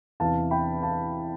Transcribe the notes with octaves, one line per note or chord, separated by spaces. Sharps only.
E2 C3 E3 F5 A5
G5 B5
F5 A5